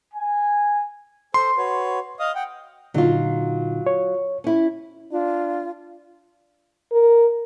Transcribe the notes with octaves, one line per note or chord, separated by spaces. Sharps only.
G#5
A4 C5 C6
F#4 B4 C#5
D#5 F5 D#6
F#5 G5
A#2 D3 F#3 D#4 F4
C#5
C#4 E4
D4 F4
A#4